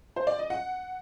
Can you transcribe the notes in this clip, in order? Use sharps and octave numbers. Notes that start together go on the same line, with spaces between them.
C5
D5
D#5
F#5